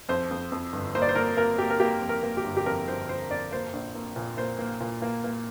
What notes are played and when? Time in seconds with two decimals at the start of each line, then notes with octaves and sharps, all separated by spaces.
0.09 F2 C5
0.31 F2
0.52 F2
0.73 G1
0.95 A#3 C5
1.02 D5
1.09 C5
1.15 A#3 A#4
1.37 A#3 A#4
1.58 A#3 G4
1.70 A#4
1.80 A#3 G4
2.01 F2
2.09 A#4
2.23 A#3
2.37 G4
2.44 G1
2.57 G4
2.66 F2 A#4
2.87 G1 C5
3.09 G1 C5
3.31 F2 D5
3.51 A#3 C5
3.73 A#1
3.95 A#3
4.16 A#2
4.37 A#3 C5
4.59 A#3
4.80 A#2
5.02 A#3
5.24 A#3